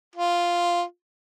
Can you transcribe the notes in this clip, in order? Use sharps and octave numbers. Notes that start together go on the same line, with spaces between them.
F4